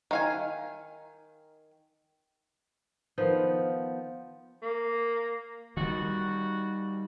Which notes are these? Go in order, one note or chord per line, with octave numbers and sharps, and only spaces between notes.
D#3 F5 G#5
D#3 F3 B3
A#3
D#3 G3 F#4